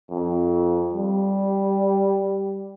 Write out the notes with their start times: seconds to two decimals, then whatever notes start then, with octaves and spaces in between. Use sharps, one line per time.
0.11 F2
0.94 G3